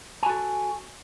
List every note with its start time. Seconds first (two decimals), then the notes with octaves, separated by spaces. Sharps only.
0.23 G#5
0.26 F#4
0.30 A4